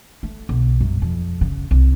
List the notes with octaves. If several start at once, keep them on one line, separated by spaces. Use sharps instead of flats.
A3
B1
F#2
F2
C#3
C2